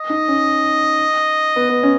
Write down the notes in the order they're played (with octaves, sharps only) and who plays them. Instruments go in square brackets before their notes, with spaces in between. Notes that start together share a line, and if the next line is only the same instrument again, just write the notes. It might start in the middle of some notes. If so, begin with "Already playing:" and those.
Already playing: [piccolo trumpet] D#5
[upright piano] D#4
C#4
B3
B3
C#4